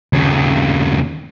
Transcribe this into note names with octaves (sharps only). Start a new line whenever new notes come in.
D#2 C#3